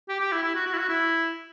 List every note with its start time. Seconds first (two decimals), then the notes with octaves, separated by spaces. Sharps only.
0.09 G4
0.21 G4
0.32 E4
0.43 E4
0.55 F#4
0.67 F#4
0.73 E4
0.78 F#4
0.89 E4